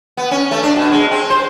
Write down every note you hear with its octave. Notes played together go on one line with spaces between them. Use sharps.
B3
C#4
A3
D4
B2
G#3
C4
C5